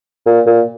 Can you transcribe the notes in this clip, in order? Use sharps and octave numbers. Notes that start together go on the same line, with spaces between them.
A#2
A#2